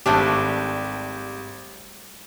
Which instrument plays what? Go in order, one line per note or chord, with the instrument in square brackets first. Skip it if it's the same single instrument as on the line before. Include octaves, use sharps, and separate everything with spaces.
[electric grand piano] G#1 G4 [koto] G3 A3 D4